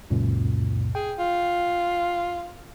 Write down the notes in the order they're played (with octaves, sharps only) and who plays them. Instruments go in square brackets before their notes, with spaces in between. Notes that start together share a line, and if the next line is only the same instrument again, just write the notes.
[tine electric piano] C#2 F#2 A#2
[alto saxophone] G#4 [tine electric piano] G5
[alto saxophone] F4